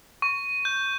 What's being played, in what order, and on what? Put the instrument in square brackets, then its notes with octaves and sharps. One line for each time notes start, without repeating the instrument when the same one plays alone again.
[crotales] C#6
G6